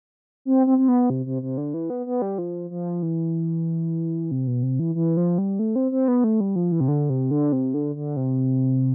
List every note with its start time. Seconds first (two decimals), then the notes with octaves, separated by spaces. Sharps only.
0.45 C4
0.67 C4
0.78 C4
0.88 B3
1.10 C3
1.26 C3
1.42 C3
1.58 D3
1.74 E3
1.90 B3
2.06 B3
2.22 G3
2.38 F3
2.70 F3
3.02 E3
4.31 C3
4.47 B2
4.63 C3
4.79 E3
4.95 E3
5.17 F3
5.38 G3
5.59 A3
5.76 C4
5.92 C4
6.08 B3
6.24 A3
6.40 G3
6.56 F3
6.72 E3
6.80 C3
6.88 D3
7.10 C3
7.31 D3
7.52 C3
7.74 D3
7.96 D3
8.17 C3